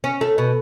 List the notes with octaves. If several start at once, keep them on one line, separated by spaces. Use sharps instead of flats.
C#4
A3
B2